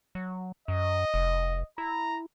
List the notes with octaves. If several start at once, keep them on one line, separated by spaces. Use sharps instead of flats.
F#3
F#2 D#5
F1
E4 A#5